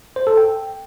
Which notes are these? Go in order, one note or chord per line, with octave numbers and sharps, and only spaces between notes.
C5
A4
G5